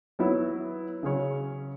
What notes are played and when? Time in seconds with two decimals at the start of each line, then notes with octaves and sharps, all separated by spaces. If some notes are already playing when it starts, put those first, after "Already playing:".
0.19 F#3 B3 E4
1.03 C#3 F#3 C#4 G#4 C#5